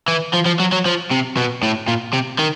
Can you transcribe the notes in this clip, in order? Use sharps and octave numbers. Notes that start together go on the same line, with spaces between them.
E3
F3
F3
F#3
F#3
F3
C3
B2
A2
A#2
C3
D#3